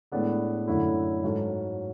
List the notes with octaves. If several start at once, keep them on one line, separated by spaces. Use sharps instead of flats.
A2 G#3 B3 D4 A4
F#2 D3 A3 C#4 E4
G#2 F#3 C#4 F#4 A4